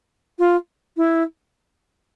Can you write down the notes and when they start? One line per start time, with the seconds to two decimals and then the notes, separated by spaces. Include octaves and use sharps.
0.38 F4
0.96 E4